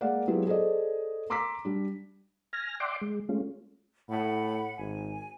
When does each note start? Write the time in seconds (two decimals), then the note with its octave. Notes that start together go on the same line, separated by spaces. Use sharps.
0.01 G#3 A#3 A#4 D5 F5 F#5
0.27 F#3 G#3 B3 E4 F4 G4
0.47 G#4 A4 C5 D5 D#5
1.30 A#5 C6 D6 E6 A#6 B6
1.65 G3 D4
2.53 G#5 F6 A#6
2.80 D5 E5 F#5 G5 C6 D6
3.01 G#3
3.29 G#3 A3 C#4 F4
4.09 A2 F#5 B5
4.79 G#1 G#5